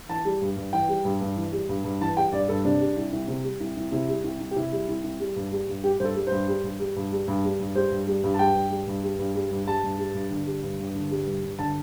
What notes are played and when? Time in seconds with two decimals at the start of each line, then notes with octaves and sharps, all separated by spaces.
0.09 E3 A5
0.25 G3
0.42 G2
0.57 G2
0.73 E3 G5
0.89 G3
1.05 G2
1.21 G2
1.36 E3
1.52 G3
1.69 G2
1.84 G2
2.01 E3 A5
2.17 G3 G5
2.32 G2 D5
2.48 G2 A4
2.65 C3 D4
2.80 G3
2.96 C2
3.13 C2
3.28 C3
3.44 G3
3.60 C2
3.76 C2
3.92 C3 E4
4.09 G3
4.24 C2
4.40 C2
4.51 G4
4.56 C3 E4
4.72 G3
4.88 C2
5.04 C2
5.20 G3
5.36 G2
5.52 G3
5.68 G2
5.84 G3 G4
6.00 G2 A4 C5
6.15 G3
6.27 G2 C5
6.48 G3
6.64 G2
6.80 G3
6.96 G2
7.12 G3
7.28 G2
7.44 G3
7.60 G2
7.75 G3 C5
7.91 G2
8.07 G3
8.24 G2
8.34 A5
8.39 G3 G5
8.55 G2
8.71 G3
8.87 G2
9.04 G3
9.19 G2
9.35 G3
9.51 G2
9.67 G3 A5
9.83 G2
9.99 G3
10.14 G2
10.31 D3
10.47 G3
10.63 G2
10.79 G2
10.95 D3
11.11 G3
11.27 G2
11.43 G2
11.59 D3 A5